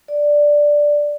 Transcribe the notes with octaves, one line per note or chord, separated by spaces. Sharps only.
D5